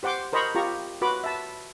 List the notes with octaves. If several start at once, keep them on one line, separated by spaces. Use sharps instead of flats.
G4 C5 F#5 C6 D6
A#4 C5 D#5 A#5 B5 C#6
F4 G4 A#5 C#6
F#4 B4 B5 C6 D6
E5 A5